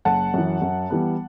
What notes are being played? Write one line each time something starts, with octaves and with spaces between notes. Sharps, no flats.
F#1 F#5 A5
F#2 E3
F#2
E3 G3 B3